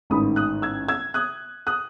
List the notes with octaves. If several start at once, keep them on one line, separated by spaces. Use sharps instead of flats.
A1 G#2 D#3 B5 D#6
D#6 F#6
E6 G#6
E6 G#6
D#6 F#6
D#6 F#6